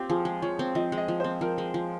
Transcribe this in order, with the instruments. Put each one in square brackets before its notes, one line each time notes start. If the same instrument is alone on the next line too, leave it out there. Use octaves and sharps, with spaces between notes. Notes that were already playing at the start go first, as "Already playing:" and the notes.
Already playing: [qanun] C4 [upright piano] F4 G4
[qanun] F3 [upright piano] G#4
[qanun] G#3
[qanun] F3 [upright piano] C#5
[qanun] C4
[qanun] F3 [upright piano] D#5
[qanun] G#3
[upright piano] D#5
[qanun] F3
[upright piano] C5
[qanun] C4
[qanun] F3 [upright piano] A#4
[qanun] G#3
F3